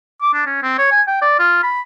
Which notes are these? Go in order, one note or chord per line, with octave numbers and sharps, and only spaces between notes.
D6
D4
C#4
C4
C#5
G#5
G5
D5
F4
B5